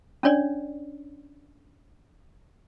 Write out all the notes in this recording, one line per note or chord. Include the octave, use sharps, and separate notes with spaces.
C#4 D4 C#5 D5